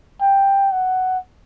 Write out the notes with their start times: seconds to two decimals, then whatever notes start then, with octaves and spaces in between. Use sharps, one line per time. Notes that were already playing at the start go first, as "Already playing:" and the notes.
0.21 G5
0.72 F#5